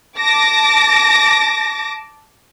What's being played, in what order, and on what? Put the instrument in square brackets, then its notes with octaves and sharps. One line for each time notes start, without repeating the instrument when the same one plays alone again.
[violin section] A5 D6 A#6